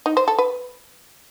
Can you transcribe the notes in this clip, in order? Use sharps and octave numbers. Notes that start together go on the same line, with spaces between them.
D#4
C5
A4
B4